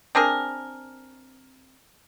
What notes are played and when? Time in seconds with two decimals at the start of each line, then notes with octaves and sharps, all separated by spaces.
0.15 C4 D4 G#4 A#4